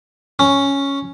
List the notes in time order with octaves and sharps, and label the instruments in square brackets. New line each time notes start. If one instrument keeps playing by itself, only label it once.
[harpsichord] C#4